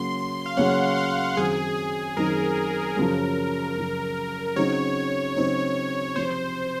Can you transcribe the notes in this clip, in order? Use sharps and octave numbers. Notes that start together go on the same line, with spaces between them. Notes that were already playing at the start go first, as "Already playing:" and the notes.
Already playing: C#3 F#3 A#3 C#4 C6
F5
C#3 F#3 A#3 C#4 F#5
F5
F#2 D#3 F#3 C4 D#4 G#4
G#4
F#2 D#3 F#3 C4 D#4 A#4
F#2 C#3 F3
F#2 C#3 F3
C#3 F#3 C4 D#4 C#5
C#3 F#3 C4 D#4 C#5
C3 F3 C4 C5